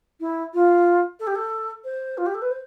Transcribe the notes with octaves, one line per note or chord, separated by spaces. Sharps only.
E4
F4
A4
G4
A4
C5
F4
G4
A4
B4
C5